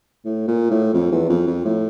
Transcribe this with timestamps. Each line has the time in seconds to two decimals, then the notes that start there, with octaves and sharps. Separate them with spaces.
0.25 A2
0.48 A#2
0.71 A2
0.94 F2
1.12 E2
1.29 F2
1.47 F2
1.65 A2